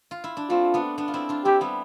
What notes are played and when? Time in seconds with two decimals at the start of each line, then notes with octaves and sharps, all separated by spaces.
0.11 F4
0.24 E4
0.37 D4
0.50 A3 C4 F4
0.74 B3 D4
0.98 B3 D4
1.08 F4
1.14 C4 E4
1.29 D4 F4
1.45 C4 E4 G4
1.61 G3 B3